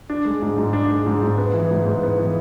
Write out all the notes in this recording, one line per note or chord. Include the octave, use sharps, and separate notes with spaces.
D4
G#3
G#2
G#2
D4
G#3
G#2
G#2
B3
E3
G#2
G#2
B3
E3